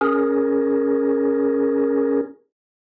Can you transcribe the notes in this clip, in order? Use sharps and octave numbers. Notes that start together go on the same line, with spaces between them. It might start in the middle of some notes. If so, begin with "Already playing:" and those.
C#4 G#4 A#4